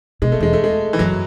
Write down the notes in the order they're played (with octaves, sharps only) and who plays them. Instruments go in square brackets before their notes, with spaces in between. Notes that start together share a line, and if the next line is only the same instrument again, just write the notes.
[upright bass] B2 [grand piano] G#3
[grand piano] A3
[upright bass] E2 [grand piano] G#3
[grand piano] A3
G#3
E3
[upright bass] F#2 [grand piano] F#3